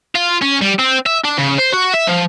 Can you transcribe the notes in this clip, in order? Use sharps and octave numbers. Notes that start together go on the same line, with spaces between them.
F4
C#4
G3
C4
E5
D4
C#3
C5
F#4
E5
F3